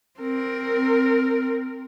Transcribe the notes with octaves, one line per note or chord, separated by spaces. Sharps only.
C4 A#4